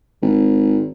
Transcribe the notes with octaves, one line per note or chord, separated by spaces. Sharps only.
G#1